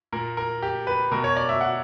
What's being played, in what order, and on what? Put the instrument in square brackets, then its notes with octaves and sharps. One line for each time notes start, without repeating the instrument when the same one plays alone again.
[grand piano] A#2 A#4
A#4
G4
B4
B2 A#4
C#5
D5
E5
F#5